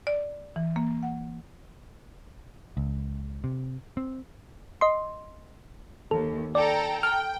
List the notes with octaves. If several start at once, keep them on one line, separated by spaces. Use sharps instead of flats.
D5
E3
A#3
F#5
C#2
C3
C4
D#5 C6
D#2 A4
A4 D5 G5 A#5
G5 F6